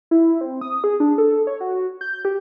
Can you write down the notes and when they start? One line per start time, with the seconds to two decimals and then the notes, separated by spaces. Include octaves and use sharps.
0.11 E4
0.41 C4
0.61 D#6
0.84 G#4
1.00 D4
1.18 A4
1.47 C#5
1.61 F#4
2.01 G6
2.25 G4